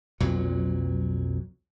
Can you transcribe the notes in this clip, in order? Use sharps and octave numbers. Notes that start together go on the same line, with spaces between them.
B1 F2 A#2 F#3